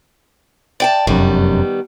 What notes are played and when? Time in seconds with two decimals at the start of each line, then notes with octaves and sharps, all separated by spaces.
0.80 D5 G5 A5
1.07 F1 F#2 D#3 G3 B3